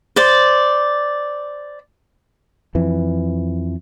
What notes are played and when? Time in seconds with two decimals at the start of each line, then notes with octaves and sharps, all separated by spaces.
0.16 C5 D5
2.75 F2 E3